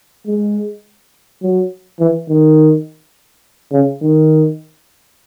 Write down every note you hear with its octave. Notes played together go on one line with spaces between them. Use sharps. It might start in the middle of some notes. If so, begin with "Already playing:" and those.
G#3
F#3
E3
D#3
C#3
D#3